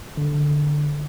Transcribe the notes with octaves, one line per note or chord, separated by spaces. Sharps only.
D3